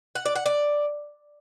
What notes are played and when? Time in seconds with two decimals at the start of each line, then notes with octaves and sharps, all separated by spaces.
0.15 F#5
0.25 D5
0.36 F#5
0.46 D5